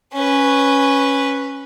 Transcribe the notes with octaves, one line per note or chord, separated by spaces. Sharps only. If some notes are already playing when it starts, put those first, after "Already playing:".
C#4 B4